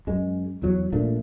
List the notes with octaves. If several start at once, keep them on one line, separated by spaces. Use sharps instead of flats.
F#2 G#3
E2 F#3
A#1 A#2 A3 D4